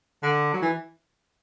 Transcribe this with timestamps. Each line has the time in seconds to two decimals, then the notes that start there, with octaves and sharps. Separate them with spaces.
0.23 D3
0.54 F#3
0.62 E3